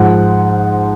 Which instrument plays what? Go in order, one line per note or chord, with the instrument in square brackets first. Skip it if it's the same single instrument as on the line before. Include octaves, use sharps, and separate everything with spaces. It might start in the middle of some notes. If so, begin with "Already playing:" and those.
Already playing: [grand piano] G#2 F3 F#5